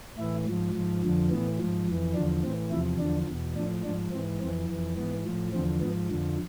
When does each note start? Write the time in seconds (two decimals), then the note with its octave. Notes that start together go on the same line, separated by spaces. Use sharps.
0.18 A2 E3 E4
0.46 G#2 F3
0.74 G#2 F3
1.03 F2 D3 F3
1.30 A2 E3 B3
1.59 G#2 F3
1.87 F2 E3
2.14 E2 D3 F3 D4
2.43 A2 E3 C4
2.71 E2 C3 F3 E4
2.99 E2 D3 F3 D4
3.27 E2 B2
3.55 A2 F3 D4
3.84 G#2 F3 D4
4.12 G#2 E3 C4
4.40 F2 E3 C4
4.69 F2 E3
4.97 G#2 E3 B3
5.25 A2 F3
5.52 E2 D3 F3 C4
5.81 G#2 B3
5.86 F3
6.10 F2 D3 F3